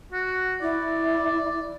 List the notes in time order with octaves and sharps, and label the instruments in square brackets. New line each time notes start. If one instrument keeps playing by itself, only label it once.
[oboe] F#4
[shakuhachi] E4 [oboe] D5